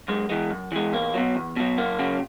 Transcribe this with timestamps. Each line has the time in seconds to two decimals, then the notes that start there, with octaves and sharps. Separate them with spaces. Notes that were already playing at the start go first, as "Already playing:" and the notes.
0.08 F#2 G#3
0.30 E3 G#3
0.51 F#2
0.72 E3 G#3
0.93 E2 A#3
1.14 B2 F#3
1.35 E2
1.56 B2 F#3
1.78 F#2 A#3
1.99 C#3 F#3